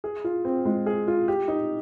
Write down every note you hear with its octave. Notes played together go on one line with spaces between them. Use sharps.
G#4
F4
C4
G#3
G#4
F4
G4
D#4